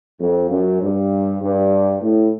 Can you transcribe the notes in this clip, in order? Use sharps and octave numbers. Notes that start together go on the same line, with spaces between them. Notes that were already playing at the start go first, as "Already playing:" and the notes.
F2
F#2
G2
G2
A2